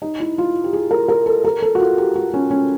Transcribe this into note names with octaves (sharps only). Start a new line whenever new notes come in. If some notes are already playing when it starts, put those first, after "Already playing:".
D#4
E4
F4
G4
G#4
A#4
A#4
A4
A#4
A4
F#4
F4
G4
F#4
C#4
C#4